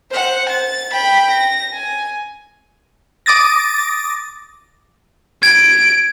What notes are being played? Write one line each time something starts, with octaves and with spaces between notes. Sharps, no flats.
C5 F#5
A6
G5 B5
A#6
G#5
D6 D#6 A6 A#6
G#6 D7